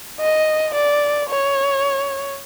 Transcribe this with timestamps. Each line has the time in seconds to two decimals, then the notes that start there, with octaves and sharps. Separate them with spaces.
0.20 D#5
0.74 D5
1.29 C#5